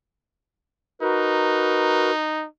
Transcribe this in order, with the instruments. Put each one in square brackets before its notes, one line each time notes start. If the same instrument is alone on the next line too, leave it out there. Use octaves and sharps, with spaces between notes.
[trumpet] D#4 [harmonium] F#4 A#4 B4